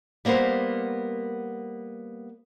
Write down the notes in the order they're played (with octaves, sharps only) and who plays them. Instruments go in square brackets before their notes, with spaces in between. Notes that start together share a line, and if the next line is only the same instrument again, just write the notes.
[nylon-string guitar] G3 A#3 B3 A#4 C5